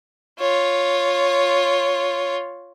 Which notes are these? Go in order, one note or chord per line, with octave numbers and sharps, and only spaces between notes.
F4 C#5